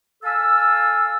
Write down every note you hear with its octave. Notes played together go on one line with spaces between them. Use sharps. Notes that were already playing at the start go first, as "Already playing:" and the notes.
A4 F5 G#5 A5 E6